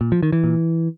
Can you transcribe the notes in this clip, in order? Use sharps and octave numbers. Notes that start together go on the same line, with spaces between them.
A#2
F3
D#3
E3
A#2